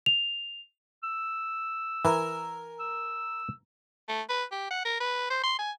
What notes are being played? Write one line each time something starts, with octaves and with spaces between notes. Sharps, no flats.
F7
E6
E3 A#4 G#5
E6
A3
B4
G4
F#5
A#4
B4
C5
C6
G#5